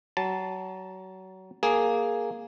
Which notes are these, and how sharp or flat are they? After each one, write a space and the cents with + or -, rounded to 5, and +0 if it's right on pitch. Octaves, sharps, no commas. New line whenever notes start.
F#3 +25 A5 +0
A#3 +0 G#4 +0